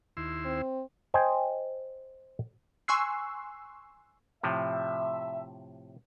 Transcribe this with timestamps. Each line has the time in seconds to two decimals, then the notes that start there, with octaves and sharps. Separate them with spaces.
0.17 D#2 E4 C6
0.45 C4
1.14 C5 D#5 G5 G#5
2.88 G#5 C6 C#6 E6 F#6 C7
4.43 A2 C3 F3 E5